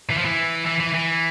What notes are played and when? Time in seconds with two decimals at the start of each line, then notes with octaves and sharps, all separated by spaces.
0.10 E3
0.18 F3
0.25 E3
0.66 E3
0.80 E3
0.94 E3